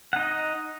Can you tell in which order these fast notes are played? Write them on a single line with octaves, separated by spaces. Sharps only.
F#5 D#4 D#5